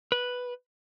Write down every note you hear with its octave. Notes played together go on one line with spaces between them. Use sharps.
B4